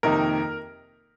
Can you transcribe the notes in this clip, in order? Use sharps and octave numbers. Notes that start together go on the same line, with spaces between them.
F2 C3 D#3 A#3 D#4 A#4